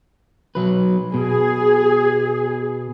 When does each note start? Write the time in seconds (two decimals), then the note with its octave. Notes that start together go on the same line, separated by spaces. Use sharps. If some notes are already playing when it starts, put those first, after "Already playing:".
0.55 B1 F#3 B4
1.14 B2 G#4